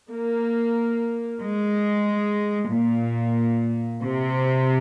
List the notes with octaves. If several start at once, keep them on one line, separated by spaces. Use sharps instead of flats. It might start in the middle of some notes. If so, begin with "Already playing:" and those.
A#3
G#3
A#2
C3